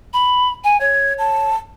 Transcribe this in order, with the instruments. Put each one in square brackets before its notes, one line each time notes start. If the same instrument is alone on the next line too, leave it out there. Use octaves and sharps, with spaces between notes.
[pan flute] B5
G#5
[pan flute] C#5 [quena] G#6
[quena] A5